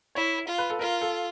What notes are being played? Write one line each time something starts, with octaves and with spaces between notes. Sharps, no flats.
E4 C#5
F4
B4
A4
F4 A#4
A4